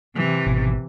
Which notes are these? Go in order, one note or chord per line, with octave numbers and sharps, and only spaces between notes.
C3 E3
G#1 B2